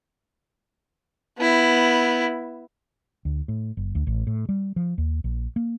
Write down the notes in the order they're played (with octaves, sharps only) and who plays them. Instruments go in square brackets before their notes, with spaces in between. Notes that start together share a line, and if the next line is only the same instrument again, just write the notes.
[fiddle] B3 E4
[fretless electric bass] D2
A2
F#1
D2
A1
A2
G3
F3
D#2
A#1
A#3